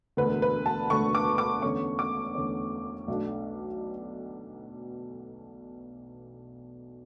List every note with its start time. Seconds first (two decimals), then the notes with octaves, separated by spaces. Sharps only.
0.17 E1 D2 D3 B4
0.42 B4
0.66 A5
0.90 E1 D2 D3 C#6
1.15 D6
1.38 D6
1.62 E2 D3 A3 C#4 C#6
1.99 D6
2.35 E2 D3 A3 C#4
3.08 B1 B2 A3 D4